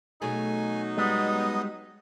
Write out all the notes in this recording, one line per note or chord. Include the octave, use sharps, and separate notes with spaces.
B2 F#3 A3 D#4 G#4 G#5
G3 G#3 B3 D#5